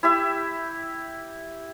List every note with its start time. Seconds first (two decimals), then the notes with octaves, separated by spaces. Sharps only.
0.03 E4 G4 E5